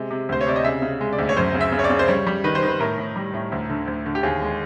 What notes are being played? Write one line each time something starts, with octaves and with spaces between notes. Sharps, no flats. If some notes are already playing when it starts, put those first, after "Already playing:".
Already playing: C3 G#3
C3
D2 C5
C#5
C3 D5
D#5
C#3 E5
C#3
G#3
D5
D2
C#5
F#2 C5
C#3
E5
C#3
C#5
D5
C#3
C5
G3 C#5
G3
D#3 B4
C5
D#3
B4
A2 A#4
A2
G3
A2
D2
D3
D2
D3
G4
D#2 G#4
G#3